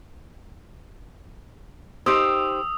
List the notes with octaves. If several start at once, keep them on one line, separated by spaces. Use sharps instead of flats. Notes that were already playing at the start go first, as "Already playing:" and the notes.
D#4 G4 C5 D#6 E6